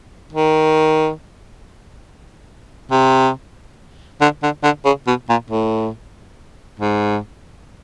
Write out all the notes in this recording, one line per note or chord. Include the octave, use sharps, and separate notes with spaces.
D#3
C3
D3
D3
D3
C#3
B2
A#2
A2
G#2